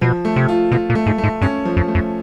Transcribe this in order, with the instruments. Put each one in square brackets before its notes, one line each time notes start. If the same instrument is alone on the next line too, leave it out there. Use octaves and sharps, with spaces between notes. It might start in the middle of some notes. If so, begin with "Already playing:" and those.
[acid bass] B2 [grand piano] F3
[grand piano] A3
[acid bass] C3
[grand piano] F4
[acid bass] B2 [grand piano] F4
[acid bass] A#2
[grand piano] A3
[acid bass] G#2
[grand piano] A3
[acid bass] G#2
[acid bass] G2 [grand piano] C#4
[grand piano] F3
[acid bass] F2
[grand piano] A3
[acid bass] F2